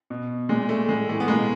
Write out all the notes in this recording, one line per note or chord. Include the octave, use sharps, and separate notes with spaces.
B2
A#2 G#3
A3
A2 G#3
E3 A3
B3
B2 G#3 A#3